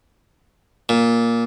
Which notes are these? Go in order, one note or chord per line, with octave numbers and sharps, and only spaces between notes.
A#2